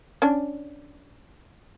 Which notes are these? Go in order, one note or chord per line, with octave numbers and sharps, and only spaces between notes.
C#4 D4